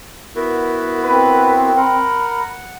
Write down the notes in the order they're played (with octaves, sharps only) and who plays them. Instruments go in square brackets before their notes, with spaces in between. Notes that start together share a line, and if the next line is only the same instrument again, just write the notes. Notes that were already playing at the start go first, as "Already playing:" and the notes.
[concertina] B3 E4 F#4 [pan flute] A#4
[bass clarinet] C4 [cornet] B4
[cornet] A#4 [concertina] F#5 [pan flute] B5